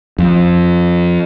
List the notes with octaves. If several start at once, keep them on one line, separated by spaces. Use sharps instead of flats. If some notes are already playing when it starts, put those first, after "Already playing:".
F2